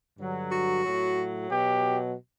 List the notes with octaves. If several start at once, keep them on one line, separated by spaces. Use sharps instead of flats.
G2 D3 F#3
F#4
A2 F#3
B2 F#3 G4